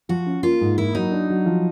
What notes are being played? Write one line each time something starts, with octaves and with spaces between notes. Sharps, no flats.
F3 F#4
C#4
A#3 F4
G#2
A#3 E4
F#3 D#4
D4
F#3
F3